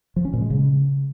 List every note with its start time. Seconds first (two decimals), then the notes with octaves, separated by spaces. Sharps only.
0.16 F3
0.25 C#4
0.33 A#2
0.42 G#3
0.50 C#3